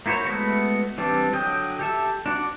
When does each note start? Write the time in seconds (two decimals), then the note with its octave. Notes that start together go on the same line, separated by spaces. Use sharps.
0.06 A#3 E4 F#4 C5 C#5
0.25 G#3 A3 B3 E4 F#4
0.98 E3 G3 C4 D4
1.33 D3 F#3 D#5 G5
1.79 G4 A4 E5
2.26 D4 F#4 D5